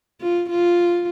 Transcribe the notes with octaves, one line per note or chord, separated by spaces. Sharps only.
F4
F4